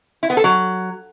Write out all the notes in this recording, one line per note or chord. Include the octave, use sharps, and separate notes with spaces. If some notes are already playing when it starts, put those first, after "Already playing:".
E4
B3
A4
F#3